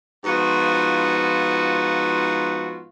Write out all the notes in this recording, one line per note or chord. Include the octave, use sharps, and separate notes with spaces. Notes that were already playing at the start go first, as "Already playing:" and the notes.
G#2 F3 B3 F4 F#4